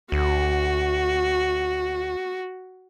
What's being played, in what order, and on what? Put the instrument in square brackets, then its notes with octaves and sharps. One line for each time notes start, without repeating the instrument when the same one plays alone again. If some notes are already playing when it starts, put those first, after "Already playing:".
[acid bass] D2 [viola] F#4